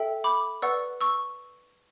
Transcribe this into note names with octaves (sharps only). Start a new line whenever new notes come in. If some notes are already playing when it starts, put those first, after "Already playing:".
Already playing: A4 E5 G5
B5 D6
B4 D5 F#5 C#6 E6
C#6 E6